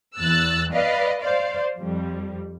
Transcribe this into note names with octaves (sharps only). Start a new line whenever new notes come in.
E2 E6 F#6 A6
B4 D5 D#5 F5
C5 D5 F5
F2 G3